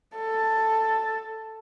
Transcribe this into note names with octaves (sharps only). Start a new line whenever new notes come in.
A4